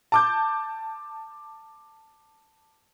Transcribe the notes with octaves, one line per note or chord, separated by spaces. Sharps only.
A5 D6 G6